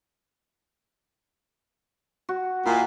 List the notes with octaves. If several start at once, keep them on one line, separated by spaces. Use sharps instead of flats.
F#4
A#2 E4